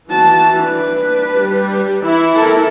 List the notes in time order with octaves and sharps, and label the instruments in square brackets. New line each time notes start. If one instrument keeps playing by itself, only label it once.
[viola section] E3 [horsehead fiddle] F#4 A5
[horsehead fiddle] D4 B4
[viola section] G3
E3 E4
[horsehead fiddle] A4 A#4